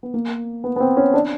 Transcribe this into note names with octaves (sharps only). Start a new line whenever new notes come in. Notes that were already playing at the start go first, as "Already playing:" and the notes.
B3
A#3
B3
B3
C4
C#4
D4